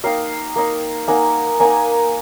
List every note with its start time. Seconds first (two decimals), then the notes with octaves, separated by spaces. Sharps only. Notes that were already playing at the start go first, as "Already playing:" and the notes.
0.04 A#3 D#4 F5 G5
0.56 A#3 D#4
1.08 A#3 D#4 F#5 G#5
1.60 A#3 D#4 F#5 G#5